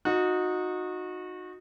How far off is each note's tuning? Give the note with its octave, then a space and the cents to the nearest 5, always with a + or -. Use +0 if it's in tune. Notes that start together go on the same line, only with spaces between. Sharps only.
D#4 +0 F#4 -25